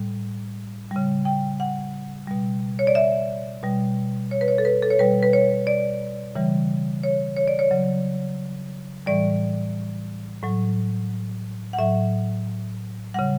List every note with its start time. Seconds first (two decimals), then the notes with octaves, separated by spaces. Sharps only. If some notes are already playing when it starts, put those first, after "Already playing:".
Already playing: A2 G3
0.91 C#3 G3
1.25 G5
1.60 F#5
2.27 B2 G3
2.79 C#5
2.87 D5
2.95 E5
3.63 B2 G3
4.31 C#5
4.41 B4
4.48 C#5
4.58 A4
4.65 B4
4.83 A4
4.91 C#5
4.99 B2 G3 B4
5.23 B4
5.33 C#5
5.67 D5
6.35 C#3 E3 G3
7.03 C#5
7.37 C#5
7.48 D5
7.59 C#5
7.71 C#3 F#3
9.06 A2 E3 G3 D5
10.42 A2 F#3
11.73 F#5
11.78 A2 F#3 E5
13.14 C#3 G3 F#5